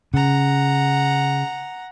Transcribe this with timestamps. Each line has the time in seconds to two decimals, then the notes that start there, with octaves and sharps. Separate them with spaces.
0.14 C#3 F#5 A#5